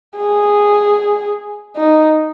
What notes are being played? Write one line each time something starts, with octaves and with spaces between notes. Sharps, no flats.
G#4
D#4